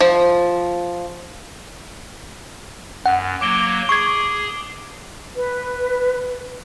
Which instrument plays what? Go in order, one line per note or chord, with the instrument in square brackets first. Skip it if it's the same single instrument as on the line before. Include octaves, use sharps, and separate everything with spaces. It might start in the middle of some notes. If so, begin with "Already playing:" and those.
[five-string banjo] F3
[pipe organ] F#2 [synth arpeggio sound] F#5
[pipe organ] F#3 A#3 [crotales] D6 D7 G7
[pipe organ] G#4 [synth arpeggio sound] C#6 G#6
[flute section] B4